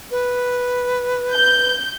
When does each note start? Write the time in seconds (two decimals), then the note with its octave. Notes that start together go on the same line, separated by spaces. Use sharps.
0.11 B4
1.33 G6